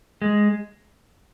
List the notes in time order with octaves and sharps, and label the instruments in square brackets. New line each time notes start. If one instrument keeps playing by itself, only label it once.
[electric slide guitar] G#3